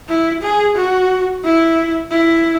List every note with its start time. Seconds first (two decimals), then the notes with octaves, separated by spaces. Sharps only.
0.08 E4
0.42 G#4
0.76 F#4
1.44 E4
2.11 E4